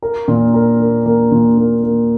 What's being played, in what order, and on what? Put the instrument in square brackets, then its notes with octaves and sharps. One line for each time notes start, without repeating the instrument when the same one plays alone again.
[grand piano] A#4
A#2
A#4
A#3
A#3
A#2
A#3
A#3